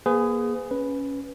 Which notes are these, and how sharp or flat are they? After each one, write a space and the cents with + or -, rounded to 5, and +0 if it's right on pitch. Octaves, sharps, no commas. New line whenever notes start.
A#3 +35 G#4 +0 B4 +40
C#4 +0 B4 +0